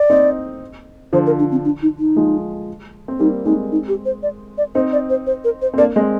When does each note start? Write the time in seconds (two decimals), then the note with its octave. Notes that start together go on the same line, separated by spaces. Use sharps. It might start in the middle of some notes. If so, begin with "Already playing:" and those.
Already playing: D5
0.10 C4 D#4
1.13 D3 F3 C5
1.26 A#4
1.39 D4
1.51 C4
1.65 D4
1.82 D#4
1.99 D#4
2.16 F3 G#3
3.08 C4
3.19 G3 A#3 D#4
3.45 G#3 C4 D#4
3.72 D#4
3.88 G4
4.05 C5
4.23 D5
4.58 D5
4.75 C4 D#4 C5
4.93 D5
5.10 C5
5.27 C5
5.44 A#4
5.62 C5
5.74 C4
5.78 A#3 D4 D5
5.95 G#3 C4 D#5